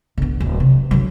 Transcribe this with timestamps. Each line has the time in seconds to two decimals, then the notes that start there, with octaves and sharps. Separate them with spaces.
0.18 D3 B3
0.40 D1
0.60 C3
0.91 D3 F#3